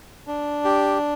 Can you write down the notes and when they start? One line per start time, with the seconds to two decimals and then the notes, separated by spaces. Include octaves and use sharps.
0.27 D4
0.65 G4